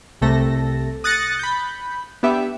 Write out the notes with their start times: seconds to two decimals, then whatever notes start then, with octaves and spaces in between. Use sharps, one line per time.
0.21 C2 C3 A3 A4 A#6
1.04 D#6 F#6 A6 A#6 C#7
1.39 B5 G6
2.23 B3 D4 G4 E5